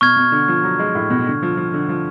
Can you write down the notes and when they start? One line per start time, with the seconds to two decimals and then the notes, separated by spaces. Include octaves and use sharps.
0.01 B2 C#6 F6 G#6
0.17 B2
0.32 D3
0.48 F3
0.64 F#3
0.79 G#3
0.95 A2
1.10 B2
1.27 D3
1.43 F3
1.57 F3
1.74 D3
1.89 F3